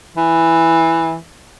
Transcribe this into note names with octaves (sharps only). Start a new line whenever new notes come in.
E3